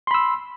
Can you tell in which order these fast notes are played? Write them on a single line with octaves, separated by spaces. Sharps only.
C6 B5 E6